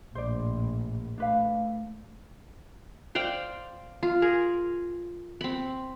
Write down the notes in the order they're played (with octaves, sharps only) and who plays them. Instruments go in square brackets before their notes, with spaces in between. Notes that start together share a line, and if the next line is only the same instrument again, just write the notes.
[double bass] A#1 A2 [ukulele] C5 D5
[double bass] A3 [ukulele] D4 B4 F5
[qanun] C5 D5 F5 G5
F4
G#4 A#4
C4 B5